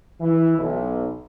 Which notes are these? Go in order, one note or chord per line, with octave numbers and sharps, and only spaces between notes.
E3
B1